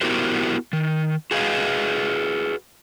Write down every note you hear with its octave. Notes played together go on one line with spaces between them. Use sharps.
B3 E4 F#4 G4 A#4 C5
D#3
F#4 G#4 B4 D#5 F5